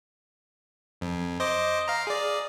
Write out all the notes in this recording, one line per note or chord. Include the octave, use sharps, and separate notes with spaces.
F2
C5 D#5 D6
F5 A#5
G#4 D5